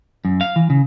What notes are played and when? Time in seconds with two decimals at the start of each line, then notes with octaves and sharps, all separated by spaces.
0.25 F#2
0.41 F5
0.56 E3
0.70 C#3